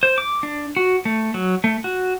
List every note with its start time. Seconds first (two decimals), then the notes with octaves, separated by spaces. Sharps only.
0.03 C5
0.18 D6
0.43 D4
0.76 F#4
1.05 A3
1.34 F#3
1.64 A3
1.84 F#4